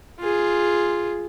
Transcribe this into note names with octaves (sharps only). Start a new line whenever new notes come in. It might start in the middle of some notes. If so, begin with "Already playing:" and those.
F4 G#4